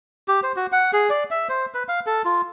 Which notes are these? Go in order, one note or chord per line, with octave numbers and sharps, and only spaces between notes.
G4
C5
F#4
F#5
G#4
D5
E5
C5
B4
F5
A4
F4